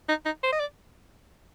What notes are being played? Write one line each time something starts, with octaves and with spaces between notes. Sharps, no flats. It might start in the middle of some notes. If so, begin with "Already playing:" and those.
D#4
D#4
C5
D#5
D5